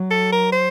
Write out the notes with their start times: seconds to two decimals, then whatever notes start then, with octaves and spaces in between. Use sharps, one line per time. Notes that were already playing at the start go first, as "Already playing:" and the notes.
Already playing: F#3
0.11 A4
0.32 A#4
0.52 C5